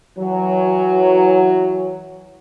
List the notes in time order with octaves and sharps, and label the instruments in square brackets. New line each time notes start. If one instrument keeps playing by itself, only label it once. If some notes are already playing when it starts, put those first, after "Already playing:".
[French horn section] E3 F#3